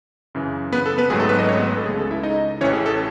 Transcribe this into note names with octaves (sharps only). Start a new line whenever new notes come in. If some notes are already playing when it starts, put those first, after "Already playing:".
F#2 C#3 E3
B3 B4
A4
B3 B4
G#1 G#2 F#3 A3 G#4
A4
B3 B4
D#4 D#5
C#4 C#5
B3 B4
B3 B4
A4
C#2 C#3 G#3 G#4
A4
E4 E5
D#4 D#5
A1 A2 E3 C#4 C#5
G#4
A4